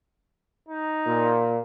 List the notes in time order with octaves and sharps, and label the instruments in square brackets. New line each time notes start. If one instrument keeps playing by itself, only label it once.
[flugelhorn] D#4
[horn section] A#2